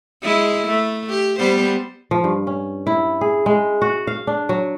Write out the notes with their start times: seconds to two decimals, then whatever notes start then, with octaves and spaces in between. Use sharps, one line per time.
0.23 G#3 E4
0.67 A3
1.09 G4
1.39 G3 B3 C5
2.11 F3
2.24 G2
2.47 C#4
2.87 E4
3.21 G#4
3.46 G#3
3.82 F#4
4.07 F5
4.27 D4
4.49 F#3